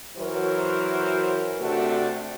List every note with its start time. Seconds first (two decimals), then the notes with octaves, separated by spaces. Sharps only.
0.17 E3 F#3 F#4 A#4 C5
1.60 C3 A3 C4 D4 F#4